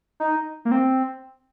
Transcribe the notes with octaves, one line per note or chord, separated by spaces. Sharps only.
D#4
A#3
C4